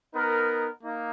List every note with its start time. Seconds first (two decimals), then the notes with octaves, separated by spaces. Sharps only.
0.14 B3 D#4 A#4
0.81 A#3 D#4